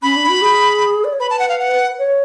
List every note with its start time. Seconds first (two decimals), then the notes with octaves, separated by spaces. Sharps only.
0.03 C#4 B5
0.16 D4
0.29 F#4
0.42 G#4
1.04 D5
1.13 C#5
1.20 B4 B5
1.30 A5
1.39 F#5
1.49 F5
1.59 F#5
1.98 C#5